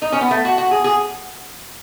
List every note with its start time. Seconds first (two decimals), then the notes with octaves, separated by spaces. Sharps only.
0.02 D#4
0.12 C#4
0.21 B3
0.31 A3
0.45 F#4
0.58 F#4
0.71 G#4
0.84 G#4